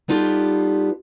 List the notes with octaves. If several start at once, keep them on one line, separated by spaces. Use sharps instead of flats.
G3 B3 D#4 F4 G4 A4